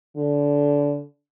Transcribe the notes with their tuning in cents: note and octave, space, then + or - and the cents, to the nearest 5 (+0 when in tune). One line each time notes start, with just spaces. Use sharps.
D3 -25